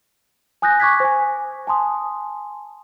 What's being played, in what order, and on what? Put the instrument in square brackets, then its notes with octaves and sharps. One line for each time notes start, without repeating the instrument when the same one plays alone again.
[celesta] G#5 D#6 F#6 G6 A#6
G#5 C#6 D6 F#6 G#6 B6
C5 G#5
G#5 A5 C6 D#6